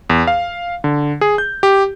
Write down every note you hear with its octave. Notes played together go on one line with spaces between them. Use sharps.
E2
F5
D3
G#4
G6
G4